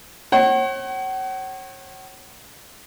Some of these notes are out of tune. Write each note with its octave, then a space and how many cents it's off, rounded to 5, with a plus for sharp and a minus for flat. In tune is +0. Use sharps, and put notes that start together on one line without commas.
C#5 -40 F#5 +40